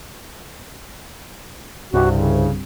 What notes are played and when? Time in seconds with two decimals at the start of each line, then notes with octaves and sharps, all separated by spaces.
1.93 C2 G2 C3 F#4
2.11 C#3